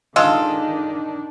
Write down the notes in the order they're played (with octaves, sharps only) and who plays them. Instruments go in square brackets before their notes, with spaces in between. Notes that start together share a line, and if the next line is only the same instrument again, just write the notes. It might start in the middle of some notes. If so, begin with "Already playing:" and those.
[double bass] D#3 D4 [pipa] G#3 F4 A4